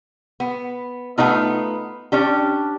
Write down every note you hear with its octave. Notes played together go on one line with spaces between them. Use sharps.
B3
A3 B3 C4 D#4 F4
C#4 D4 G4